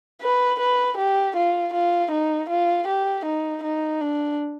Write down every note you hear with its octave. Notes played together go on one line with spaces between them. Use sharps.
B4
B4
G4
F4
F4
D#4
F4
G4
D#4
D#4
D4